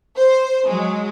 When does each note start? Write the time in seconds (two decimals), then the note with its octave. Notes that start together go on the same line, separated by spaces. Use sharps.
0.17 C5
0.68 F#3 G#3